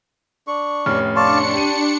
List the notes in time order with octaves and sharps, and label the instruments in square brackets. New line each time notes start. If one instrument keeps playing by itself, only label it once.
[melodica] D4 C#6
[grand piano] F1 A2 C#4 [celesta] F6
[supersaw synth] D4 C#7 [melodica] D5 F5 A5 [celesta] C6 C#6
[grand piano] G4 D#7 [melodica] A5